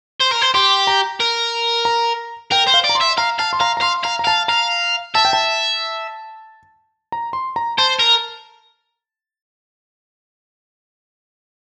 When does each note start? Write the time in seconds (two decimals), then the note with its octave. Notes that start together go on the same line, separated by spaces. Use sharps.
0.21 C5
0.32 A#4
0.42 C5
0.54 G4 C6
0.87 A#5
1.20 A#4
1.85 A#5
2.52 A#4 G5
2.67 C5
2.74 F5
2.84 D5
2.89 A#5
2.95 C6
3.01 E5
3.17 F5 A#5
3.39 F5 A5
3.53 C6
3.60 F5 A#5
3.77 A#5
3.81 F5 C6
4.03 F5 A#5
4.19 A#5
4.24 F5 A5
4.48 F5 A#5
5.15 E5 A5
5.25 G5
5.33 A5
7.12 A#5
7.33 C6
7.56 A#5
7.78 C5 A5
7.99 A#4